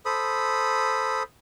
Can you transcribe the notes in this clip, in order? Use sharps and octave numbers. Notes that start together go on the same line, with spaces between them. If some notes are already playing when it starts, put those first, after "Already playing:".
A4 C5 B5 D#6